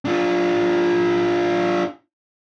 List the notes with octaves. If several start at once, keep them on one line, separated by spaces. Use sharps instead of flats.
D4 F4